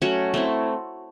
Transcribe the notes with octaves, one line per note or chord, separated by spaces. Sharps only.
F#3 A3 C#4 F#4
A3 C4 E4